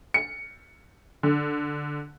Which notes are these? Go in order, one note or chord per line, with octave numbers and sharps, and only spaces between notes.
C#7
D3